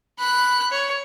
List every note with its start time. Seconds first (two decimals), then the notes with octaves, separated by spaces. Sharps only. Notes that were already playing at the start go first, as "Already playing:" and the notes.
0.20 B5 F#6
0.71 C#5